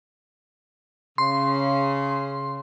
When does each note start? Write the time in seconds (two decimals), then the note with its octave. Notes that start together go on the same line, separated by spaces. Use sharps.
1.18 C#3 C6